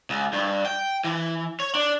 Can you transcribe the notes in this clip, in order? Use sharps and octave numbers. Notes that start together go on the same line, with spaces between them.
C#2
G2
G5
E3
C#5
D4